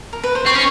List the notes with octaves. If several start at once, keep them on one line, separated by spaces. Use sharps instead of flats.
A#4
B4
C5
C4 C#5
C#4